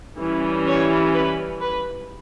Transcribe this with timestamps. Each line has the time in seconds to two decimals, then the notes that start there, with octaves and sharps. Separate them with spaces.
0.19 E3 G3 C#4
0.67 C#5
1.14 B4
1.62 B4